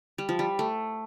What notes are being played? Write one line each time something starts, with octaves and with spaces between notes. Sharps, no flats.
G3
F3
G3
A3